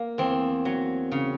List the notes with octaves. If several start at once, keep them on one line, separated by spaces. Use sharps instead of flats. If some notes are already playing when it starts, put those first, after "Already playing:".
Already playing: A#3
E2 C4
F#3
C#3